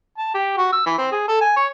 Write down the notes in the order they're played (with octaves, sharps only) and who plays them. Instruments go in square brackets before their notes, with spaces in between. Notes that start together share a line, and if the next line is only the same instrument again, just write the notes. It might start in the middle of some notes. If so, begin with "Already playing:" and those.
[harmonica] A5
G4
F#4
E6
E3
C4
G#4
A4
G#5
C#5